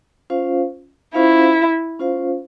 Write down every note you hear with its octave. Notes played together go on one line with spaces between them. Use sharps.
C#4 F4 C5 F5
C#4 E4 F4 C5 F5
C#4 F4 C5 F5